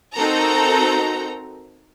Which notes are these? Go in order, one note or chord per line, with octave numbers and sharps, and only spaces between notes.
C4 D#4 F#4 A4 A#4 A#5